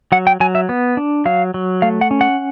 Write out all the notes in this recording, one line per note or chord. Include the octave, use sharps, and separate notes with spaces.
F#3 F#5
G5
F#3 G#5
E5
B3
D4
F#3 F5
F#3
A3 F5
F#5
C#4
F#5